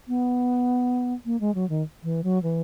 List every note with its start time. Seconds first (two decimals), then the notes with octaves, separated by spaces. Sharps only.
0.08 B3
1.25 A#3
1.40 G#3
1.55 F#3
1.70 D#3
2.03 E3
2.24 F#3
2.43 E3